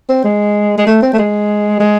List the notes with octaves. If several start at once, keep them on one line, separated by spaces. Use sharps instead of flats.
C4
G#3
G#3
A3
C4
A3
G#3
G#3